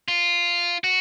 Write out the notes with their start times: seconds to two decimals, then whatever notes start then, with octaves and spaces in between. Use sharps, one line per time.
0.08 F4
0.84 F#4